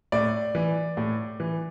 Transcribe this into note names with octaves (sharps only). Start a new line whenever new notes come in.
A2 D5
E3
A2
E3